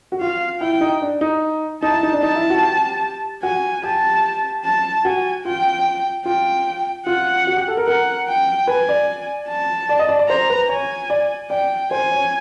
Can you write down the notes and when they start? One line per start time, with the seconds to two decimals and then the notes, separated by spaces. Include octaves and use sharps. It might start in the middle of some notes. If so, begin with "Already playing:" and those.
0.12 F#4
0.21 F4 F5
0.61 E4 G5
0.81 D#4
1.02 D4
1.21 D#4
1.82 D#4 A5
1.92 E4
2.03 D#4
2.13 D4
2.23 D#4 A5
2.36 E4
2.50 F#4
2.63 G4
3.43 F#4 G#5
3.83 G4 A5
4.65 A5
5.05 F#4 G#5
5.45 F4 G5
6.25 F4 G5
7.06 F4 F#5
7.47 F#4
7.57 G4
7.68 A4
7.77 A#4
7.87 A#4 F#5
8.28 G5
8.67 B4 G#5
8.89 D5
9.49 A5
9.89 D5
9.99 D#5
10.09 D5
10.19 D5
10.29 C5 A#5
10.50 B4
10.69 C#5 G#5
11.10 D5
11.50 D5 G5
11.91 C5 G#5
12.11 C#5